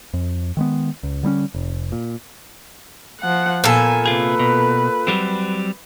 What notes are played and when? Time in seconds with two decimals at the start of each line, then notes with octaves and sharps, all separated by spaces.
0.14 F2
0.57 D#3 G#3 B3
1.03 C#2
1.23 D3 G3 C4 C#4
1.54 F1
1.92 A#2
3.20 F3 F#5
3.64 A#2 B3 A4 G#5
4.06 C3 F4 G#4 B4
4.39 B2
5.07 F#3 G3 C4